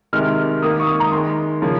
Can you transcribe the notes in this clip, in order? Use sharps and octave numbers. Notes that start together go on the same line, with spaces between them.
C3 D#3 G#3 F6
D#3 A#3 D#6
C#6
D#6
A#5
D#3 G#3 C6
C#3 F3 A#3